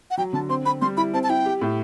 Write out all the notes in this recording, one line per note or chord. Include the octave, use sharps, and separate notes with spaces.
F#5
F#3 G5
D3 A5
C4 C6
C4 B5
G3 C6
E4 B5
C4 A5
A5
E4 G5
G4
A2